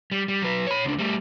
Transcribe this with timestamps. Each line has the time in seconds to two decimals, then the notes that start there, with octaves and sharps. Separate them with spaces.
0.11 G3
0.28 G3
0.42 F#3 B4
0.66 C#5 B5
0.85 C#2 D4
0.99 G3 A3